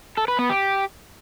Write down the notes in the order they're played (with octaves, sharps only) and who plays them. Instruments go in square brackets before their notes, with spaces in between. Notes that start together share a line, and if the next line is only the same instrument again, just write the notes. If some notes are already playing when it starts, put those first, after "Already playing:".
[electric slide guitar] A4
B4
B3
G4